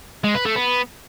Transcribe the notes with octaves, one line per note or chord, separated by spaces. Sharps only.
G#3
B4
A3
B3